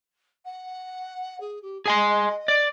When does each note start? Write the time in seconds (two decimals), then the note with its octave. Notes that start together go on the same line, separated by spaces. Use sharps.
0.45 F#5
1.40 G#4
1.62 G4
1.86 G#4 D#5 G#5 C6
2.48 D5